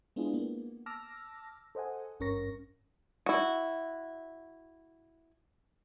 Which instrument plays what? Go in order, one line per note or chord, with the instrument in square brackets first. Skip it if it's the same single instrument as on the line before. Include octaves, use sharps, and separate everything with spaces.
[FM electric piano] G#3 B3 D4 E4 F4 G#4
A#3 B3
A5 D6 E6 F6 A#6
A4 C5 D#5 F#5 G#5
G#1 G2 C#4 A#4 C#6 A#6
[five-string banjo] E4 F#4